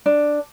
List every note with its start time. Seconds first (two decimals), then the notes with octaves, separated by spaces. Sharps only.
0.06 D4